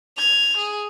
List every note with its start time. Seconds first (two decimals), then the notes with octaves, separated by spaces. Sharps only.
0.17 G#6 F7
0.57 G#4